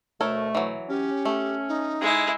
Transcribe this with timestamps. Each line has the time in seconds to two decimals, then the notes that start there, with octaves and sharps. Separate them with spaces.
0.21 D2 B2 A3 A4 A#4 C#5
0.55 E3 F#3
0.89 C#4 G4
1.25 A3
1.69 D#4
2.01 G#3 E4